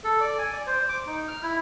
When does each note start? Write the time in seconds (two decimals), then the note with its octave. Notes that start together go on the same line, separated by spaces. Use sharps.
0.04 A4
0.21 D5
0.38 G#5
0.53 D5
0.67 C5
0.89 D6
1.07 D#4
1.28 F6
1.43 E4